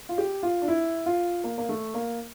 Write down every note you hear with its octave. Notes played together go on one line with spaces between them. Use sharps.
F4
G4
F4
D4
E4
F4
A#3
A#3
A3
A#3